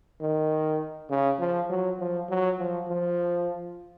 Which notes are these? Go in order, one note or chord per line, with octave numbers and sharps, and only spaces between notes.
D#3
C#3
F3
F#3
F3
F#3
F3
F3